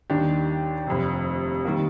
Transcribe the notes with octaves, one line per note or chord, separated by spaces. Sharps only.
D#2 D#3 G3 D4 G4
F1 F2 C3
D#3 G3 A#3